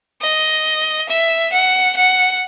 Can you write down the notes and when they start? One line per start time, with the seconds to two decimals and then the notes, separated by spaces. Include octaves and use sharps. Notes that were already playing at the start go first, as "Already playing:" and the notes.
0.22 D#5
1.09 E5
1.52 F#5
1.96 F#5